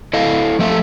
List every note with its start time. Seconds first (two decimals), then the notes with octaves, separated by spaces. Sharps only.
0.13 E4 A4 D#5 F5
0.59 F3 A3 A4 E5